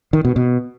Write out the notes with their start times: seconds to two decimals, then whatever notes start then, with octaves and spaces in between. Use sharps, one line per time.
0.13 D#3
0.25 B2
0.36 B2